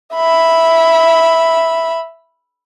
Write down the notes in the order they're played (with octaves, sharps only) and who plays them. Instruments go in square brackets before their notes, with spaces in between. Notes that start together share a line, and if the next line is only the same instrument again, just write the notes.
[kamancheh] E5 B5